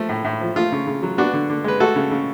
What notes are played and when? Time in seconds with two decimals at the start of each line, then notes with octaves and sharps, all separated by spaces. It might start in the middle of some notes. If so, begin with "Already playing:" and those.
Already playing: F3 A3
0.09 A2
0.25 A2
0.41 F3
0.56 A3 F4
0.72 C#3
0.87 C#3
1.03 F#3
1.18 B3 D4 F#4
1.33 D3
1.50 D3
1.64 G#3 B4
1.80 A3 F#4 A4
1.96 C#3
2.11 C#3